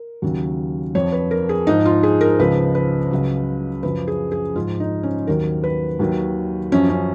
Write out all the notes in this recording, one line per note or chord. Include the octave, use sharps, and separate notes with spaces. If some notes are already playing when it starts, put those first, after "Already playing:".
Already playing: A#4
D#2 C#3 F#3
F2 F3 C#5
B4
A#4
G#4
G#2 F3 D#4
F4
G#4
A#4
C#2 C#3 F3 B4
B4
C#2 C#3 F#3
F#2 C#3 F3 B4
G#4
G#4
G#2 F3 F4
D#4
C#4
D#2 D#3 F#3 A#4
B4
D#2 D#3 F#3
F#2 F3 C#4
C#4